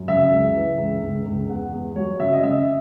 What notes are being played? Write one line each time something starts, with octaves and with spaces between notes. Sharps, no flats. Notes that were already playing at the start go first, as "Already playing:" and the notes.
Already playing: F#2
C#3 E5
C#2
E3
C#2
C#2
C#2
E2 F#5
E2
F#3 C#5
C#3 E5
D#5
C#3 E5